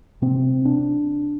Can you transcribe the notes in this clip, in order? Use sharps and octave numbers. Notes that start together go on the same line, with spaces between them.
C3 C4
D4